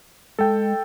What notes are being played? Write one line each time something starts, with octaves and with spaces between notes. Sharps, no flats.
G#3 A4 G5